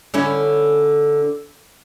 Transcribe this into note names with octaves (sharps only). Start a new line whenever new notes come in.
D3 C#4 E4